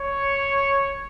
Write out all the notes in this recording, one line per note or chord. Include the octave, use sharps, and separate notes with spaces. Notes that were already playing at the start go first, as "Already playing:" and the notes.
Already playing: C#5